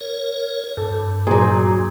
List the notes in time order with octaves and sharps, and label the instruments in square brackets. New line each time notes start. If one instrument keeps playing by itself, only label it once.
[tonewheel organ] A#4 C#5
[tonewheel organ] G2 [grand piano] A4
[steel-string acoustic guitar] A#2 F#3 [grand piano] G#4